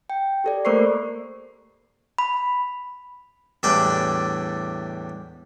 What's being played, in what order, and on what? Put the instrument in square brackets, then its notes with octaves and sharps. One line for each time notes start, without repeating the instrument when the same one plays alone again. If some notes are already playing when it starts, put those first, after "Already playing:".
[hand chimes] G5
G4 A4 D5
A3 A#3 A#4 C5 C#6 C7
B5
[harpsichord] E2 A2 G3 D4 G5 B5